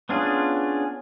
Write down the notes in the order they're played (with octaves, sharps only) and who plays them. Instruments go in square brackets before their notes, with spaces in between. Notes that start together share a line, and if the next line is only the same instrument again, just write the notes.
[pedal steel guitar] B3 C#4 D4 F4 G#4